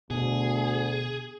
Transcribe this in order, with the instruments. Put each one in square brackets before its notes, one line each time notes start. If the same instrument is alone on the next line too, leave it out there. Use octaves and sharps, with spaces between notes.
[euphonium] D2 [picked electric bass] B2 [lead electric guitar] G#4